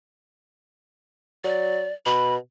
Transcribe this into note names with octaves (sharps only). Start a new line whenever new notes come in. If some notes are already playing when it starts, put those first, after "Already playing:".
F#3 D5
B2 B5